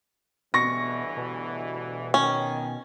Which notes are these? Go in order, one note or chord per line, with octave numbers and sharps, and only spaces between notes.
D2 G2 B2 E3 C#6 A#6
B2
D#3 C#4